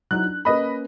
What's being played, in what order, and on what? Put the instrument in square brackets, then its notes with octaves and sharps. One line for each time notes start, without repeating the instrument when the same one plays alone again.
[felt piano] F#3 D#4 E4 [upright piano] F#6
[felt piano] D4
[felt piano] A#3 C#4 B4 [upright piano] D#5 B5